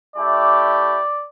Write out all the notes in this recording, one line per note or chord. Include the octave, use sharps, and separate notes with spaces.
A3 E4 G4 D5